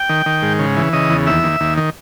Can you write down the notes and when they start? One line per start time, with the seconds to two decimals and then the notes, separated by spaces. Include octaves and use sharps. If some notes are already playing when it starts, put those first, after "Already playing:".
Already playing: G5
0.09 D#3
0.26 D#3
0.42 G#2
0.59 C#3
0.77 E3
0.93 C#3 D#5
1.10 E2
1.27 D#2 E5
1.43 D#2
1.60 D#2
1.77 D#3